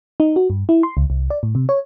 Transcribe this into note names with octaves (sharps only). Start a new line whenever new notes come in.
D#4
F#4
G2
E4
C6
C#2
C2
D5
A2
C3
C#5